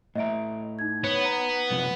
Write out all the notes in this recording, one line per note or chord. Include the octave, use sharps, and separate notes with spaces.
A2 A3 D#5 E5 A#5 D7
D#4 G#6
B3 C#5
A#5
F#2 C3 F3